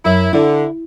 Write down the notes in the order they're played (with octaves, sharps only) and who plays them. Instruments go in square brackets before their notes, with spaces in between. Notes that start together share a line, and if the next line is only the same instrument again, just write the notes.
[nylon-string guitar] F#2 [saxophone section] E4
[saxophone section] D3 [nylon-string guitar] E4